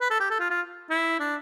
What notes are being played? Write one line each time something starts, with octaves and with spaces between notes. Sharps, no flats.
B4
A4
G4
A4
F4
F4
E4
D4